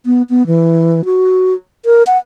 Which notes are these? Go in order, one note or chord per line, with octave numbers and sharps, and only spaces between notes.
B3
B3
E3
F#4
A#4
F#5